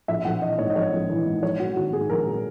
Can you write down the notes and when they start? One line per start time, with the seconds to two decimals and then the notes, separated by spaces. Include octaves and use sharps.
0.08 A#1 E5
0.25 A#1 F#5
0.42 E3 D#5
0.58 G#2 C#5
0.70 D#5
0.75 A#1 C#5
0.93 A#1
1.10 E3
1.25 G#2
1.42 A#1 C#5
1.60 F#3 F#4
1.76 D#3 F#4
1.93 G#2 G#4
2.10 A#1 A#4
2.26 F#3